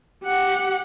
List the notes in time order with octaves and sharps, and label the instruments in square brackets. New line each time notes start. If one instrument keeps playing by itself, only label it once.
[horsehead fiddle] G4 F#5